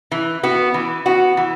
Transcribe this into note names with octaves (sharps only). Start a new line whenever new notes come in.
E3
B3 F#4
E3
B3 F#4
E3